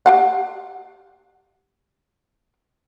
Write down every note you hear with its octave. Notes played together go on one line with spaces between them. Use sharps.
G4 F5 F#5